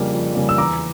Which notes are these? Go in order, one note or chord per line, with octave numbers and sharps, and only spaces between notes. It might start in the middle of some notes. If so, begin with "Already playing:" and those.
Already playing: F2 C#3 G3 A#3
F2
C#3 G3 A#3
E6
E2 A#5 D6